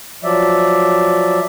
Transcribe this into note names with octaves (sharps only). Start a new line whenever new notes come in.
F3 F#3 D5 E5